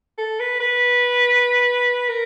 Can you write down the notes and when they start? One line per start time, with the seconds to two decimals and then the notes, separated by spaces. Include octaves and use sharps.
0.18 A4
0.40 B4
0.60 B4
2.09 A#4